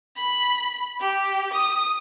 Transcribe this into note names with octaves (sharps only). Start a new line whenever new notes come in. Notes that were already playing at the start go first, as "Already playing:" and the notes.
B5
G4
D#6